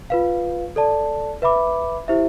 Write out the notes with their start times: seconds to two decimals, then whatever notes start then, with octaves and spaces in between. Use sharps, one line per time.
0.10 F4 B4 F5
0.76 A4 D5 A5
1.42 B4 E5 B5 D6
2.08 E4 G4 C5 E5